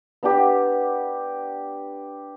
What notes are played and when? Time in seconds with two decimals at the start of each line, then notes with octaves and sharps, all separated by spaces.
0.23 B3 D4 G4